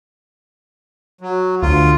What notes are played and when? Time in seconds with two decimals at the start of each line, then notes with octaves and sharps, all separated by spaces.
1.21 F#3
1.62 D2 F4